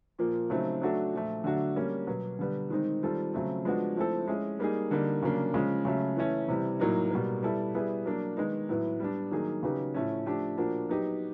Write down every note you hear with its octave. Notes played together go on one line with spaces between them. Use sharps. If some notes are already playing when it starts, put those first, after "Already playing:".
A#2 F3 A#3
C#3 F#3 A3 C4 D#4
F#3 A3 D4 F#4 A4
A#2 F3 A3
D3 F#3 A3 D4 F#4
G3 A#3 C#4
B2 F#3 B3
D3 G3 B3
D#3 G#3 C4 D#4
D#3 G3 C4 F4 A4
C#3 F#3 A3 C4
F3 G#3 B3 D4 F#4
F3 A3 C4 E4 A4
G#3 C#4 E4 G#4
G3 A#3 D#4 G#4
D3 G3 A#3 D#4
C#3 F#3 A#3 D4
C#3 F3 G#3
C#3 F#3 A3
E3 A3 C#4
C3 E3 G3
A2 F#3 A#3 D#4
B2 G3 A#3
G3 B3 E4 A4
G3 B3 E4 G#4
F#3 A#3 D4
D#3 G#3 B3 D#4
A2 F#3 B3 E4
G3 B3 D4
D#3 F#3 A#3 D#4 G#4
C#3 F#3 B3 D#4 G4
A2 F3 A3 C#4
F3 A3 D4 G4
A#2 F3 A#3 D4 F#4
F#3 B3 D#4 G4